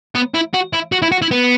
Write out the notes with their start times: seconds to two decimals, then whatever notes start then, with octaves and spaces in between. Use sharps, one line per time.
0.15 B3
0.34 E4
0.54 F#4
0.73 E4
0.92 F#4
1.02 E4
1.12 F#4
1.22 E4
1.31 B3